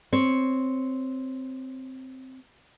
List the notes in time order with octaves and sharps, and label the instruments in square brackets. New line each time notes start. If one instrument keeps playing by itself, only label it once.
[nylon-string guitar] C4 C#5